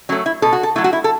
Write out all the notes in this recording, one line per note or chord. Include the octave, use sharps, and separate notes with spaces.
F#3 A3 C#4
E4
B2 A4
F#4
A4
F#3 A3 E4
F#4
E4
A4